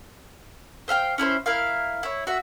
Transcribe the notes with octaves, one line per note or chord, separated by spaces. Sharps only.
C5 E5 F5 G5
C#4 E4 A#4 C5
E4 A#4 F5
E4 C#5
F#4 E5